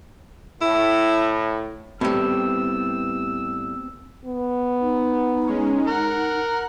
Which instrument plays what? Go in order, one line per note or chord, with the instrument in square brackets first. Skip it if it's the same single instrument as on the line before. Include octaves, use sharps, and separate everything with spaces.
[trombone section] A2 [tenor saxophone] E4
[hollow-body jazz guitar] A2 G3 [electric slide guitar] B3 C4 G4 [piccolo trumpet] E6
[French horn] B3
[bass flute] D#4
[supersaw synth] G#3 C#4
[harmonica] A#4 [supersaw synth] F#5 F#6